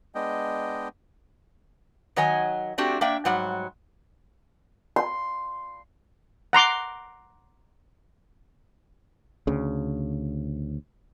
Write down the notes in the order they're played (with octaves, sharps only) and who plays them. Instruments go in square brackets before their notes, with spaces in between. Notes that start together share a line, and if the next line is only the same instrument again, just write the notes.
[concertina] G#3 B3 D4 D#5 G5
[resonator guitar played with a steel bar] D#3 F#3 C#5 D#5 F#5 G#5
A3 C4 D4 F#4 G4
A#3 D4 D5 E5 G5
G#2 F#3 G3 F#5
[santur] C6
[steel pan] F#5 A#5 C6 D6
[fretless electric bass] D2 C#3